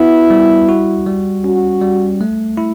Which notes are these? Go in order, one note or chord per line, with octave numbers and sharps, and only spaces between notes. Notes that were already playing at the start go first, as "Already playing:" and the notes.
Already playing: B3 E4 F#4 B4
G3
F#4
G3
C#4 F#4
G3
A3
E4